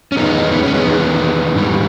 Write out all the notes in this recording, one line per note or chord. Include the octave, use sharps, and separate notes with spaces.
C#4
E2 D#3 G#3 B3 D#4
B3
C#4
G#3 B3
E2 D#3 G#3
G#2 E3 G3